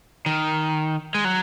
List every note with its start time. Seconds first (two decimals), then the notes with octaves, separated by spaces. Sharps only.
0.26 D#3
1.15 G#3
1.25 F#3